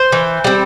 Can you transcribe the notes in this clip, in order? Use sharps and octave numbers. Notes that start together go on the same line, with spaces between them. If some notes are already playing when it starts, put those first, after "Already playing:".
Already playing: C5
E3
G3 C4